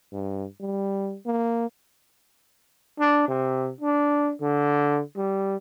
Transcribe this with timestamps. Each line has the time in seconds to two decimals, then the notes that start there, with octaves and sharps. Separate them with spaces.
0.13 G2
0.61 G3
1.26 A#3
3.00 D4
3.28 C3
3.81 D4
4.42 D3
5.16 G3